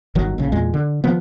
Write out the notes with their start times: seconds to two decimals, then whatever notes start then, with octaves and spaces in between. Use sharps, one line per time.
0.15 G1 D#3 F#3
0.38 A#1 C#3
0.52 E2 A#2 G#3
0.74 D3
1.04 D#3 F3 B3